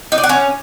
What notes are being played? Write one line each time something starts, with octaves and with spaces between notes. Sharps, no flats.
D#4
D5
F#5
C#4